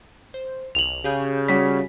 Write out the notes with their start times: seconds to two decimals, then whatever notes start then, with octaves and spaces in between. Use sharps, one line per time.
0.34 C5
0.75 C2 F7 F#7
1.04 C#3 G4 G#4 G6
1.48 G3 C#4 F#4 B6